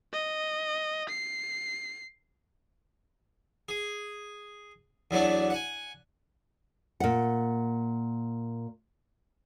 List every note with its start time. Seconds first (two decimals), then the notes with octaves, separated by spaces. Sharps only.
0.13 D#5
1.09 C7
3.69 G#4
5.11 E2 F#3 A3 D4
5.50 F#5 G#5
7.00 A#2 F#5